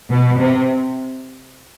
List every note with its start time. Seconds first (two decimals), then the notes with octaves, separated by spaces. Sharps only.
0.10 B2
0.38 C3